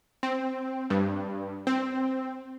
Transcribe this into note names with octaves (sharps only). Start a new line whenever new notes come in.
C4
G2
C4